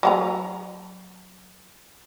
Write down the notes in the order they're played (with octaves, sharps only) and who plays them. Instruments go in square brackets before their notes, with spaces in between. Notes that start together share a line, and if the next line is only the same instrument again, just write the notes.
[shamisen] F#3 F#4 A#5